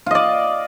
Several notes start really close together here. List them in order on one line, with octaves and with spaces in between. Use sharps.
F4 D#5 D5